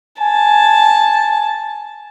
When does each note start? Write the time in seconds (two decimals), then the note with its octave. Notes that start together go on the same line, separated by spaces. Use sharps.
0.21 G#5 A5